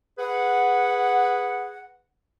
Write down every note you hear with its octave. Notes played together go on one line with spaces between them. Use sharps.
G#4 B4 F#5